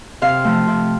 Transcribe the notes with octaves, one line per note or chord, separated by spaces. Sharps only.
C3 F5
F3 A3
C3